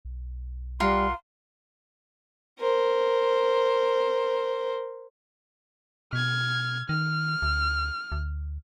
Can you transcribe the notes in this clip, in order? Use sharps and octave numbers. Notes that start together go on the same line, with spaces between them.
B1
G3 F4 A#4 F#5 C6
A#4 C5
B2 F6 G#6
D#3 F6
D2
D2